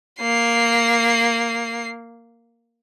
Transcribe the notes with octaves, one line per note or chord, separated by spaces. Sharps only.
A#3 C7